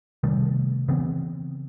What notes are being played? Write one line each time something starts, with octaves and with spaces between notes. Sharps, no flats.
C3 D#3 G3 A3
C#3 E3 B3 C4